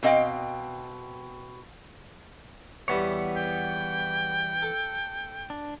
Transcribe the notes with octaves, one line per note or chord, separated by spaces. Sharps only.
B2 C4 D#5 F5 G5
E2 E3 G3 B3 C#5
G5
A4
D4